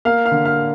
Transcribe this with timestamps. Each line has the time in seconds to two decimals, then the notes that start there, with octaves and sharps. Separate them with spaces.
0.05 A#3 F5 F6
0.26 F5 F6
0.32 D3
0.45 F5 F6